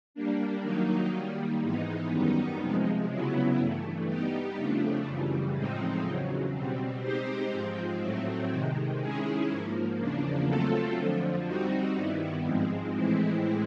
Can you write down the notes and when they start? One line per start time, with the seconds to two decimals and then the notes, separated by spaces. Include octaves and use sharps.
0.14 G3 A#3 D4
0.63 D#3 F#3 A#3 D#4
1.12 D#3 G3 A#3
1.62 G#2 E3 G#3 B3 D#4
2.10 F#2 D#3 G3 B3 D#4
2.60 C3 F3 G#3
3.10 C#3 F#3 B3 E4
3.58 G2 E3 A3
4.08 G3 B3 D#4 G4
4.56 F2 C#3 F3 A3 D4
5.06 F#2 C#3 E3 G3
5.56 A2 F3 G#3 C4 D#4
6.05 E2 C#3 F#3
6.54 B2 G3 C4
7.03 G#3 C4 D#4 G4 C5
7.52 G#2 F3 G#3 C4
8.02 A2 F#3 A3 C4
8.51 C3 D#3 G#3
9.00 D#3 G#3 C#4 E4 G#4
9.49 G#2 F3 A#3
9.98 E2 C#3 F3 A#3 D4
10.48 F#3 A3 C4 F4 A4
10.96 F2 D3 F3
11.46 G3 C4 D#4 F#4
11.96 G2 D#3 G3 B3 E4
12.45 G#2 F3 G#3 C4
12.94 A2 E3 G#3 C4 E4